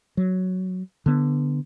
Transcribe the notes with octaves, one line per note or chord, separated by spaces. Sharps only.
F#3
D3 B3